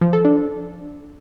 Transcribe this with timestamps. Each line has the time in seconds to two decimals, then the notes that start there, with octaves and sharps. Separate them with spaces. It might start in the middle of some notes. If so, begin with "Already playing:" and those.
0.01 F3
0.13 A4
0.25 D4